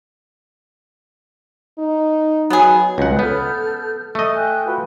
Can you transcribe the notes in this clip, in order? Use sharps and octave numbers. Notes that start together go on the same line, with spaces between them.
D#4
F#3 B3 G#4
C#2 F#5
B3 A4 F6 G6
A3 D#5 D#6
G5 G#5 F#6
F4 F#4 B4